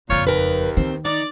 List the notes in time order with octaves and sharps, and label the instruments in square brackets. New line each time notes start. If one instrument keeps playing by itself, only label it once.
[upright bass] F#1 F2 [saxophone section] A#2 F4 C#5
[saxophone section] D#2 [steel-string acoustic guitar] A#4 B4
[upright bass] D#3 [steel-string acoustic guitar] C4
[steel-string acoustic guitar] D#4 [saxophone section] D5